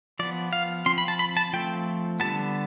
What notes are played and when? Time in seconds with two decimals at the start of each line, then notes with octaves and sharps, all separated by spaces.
0.19 F3 B3 D5
0.53 F5
0.86 F3 C4 C6
0.98 B5
1.08 A5
1.19 B5
1.37 A5
1.53 F3 A3 C4 G5
2.20 D3 G3 B3 A5